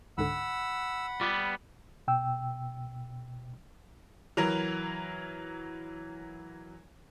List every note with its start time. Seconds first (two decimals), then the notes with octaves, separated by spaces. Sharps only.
0.18 C#2 G#2 D3 F#5 B5 E6
1.21 G3 B3 F4
2.08 B2 G5 E6
4.37 E3 F#3 A#4